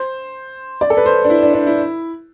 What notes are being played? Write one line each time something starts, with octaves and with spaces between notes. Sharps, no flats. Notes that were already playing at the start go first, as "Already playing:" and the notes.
Already playing: C5
D5
A4
B4
C5
D4
E4
D4
D4
E4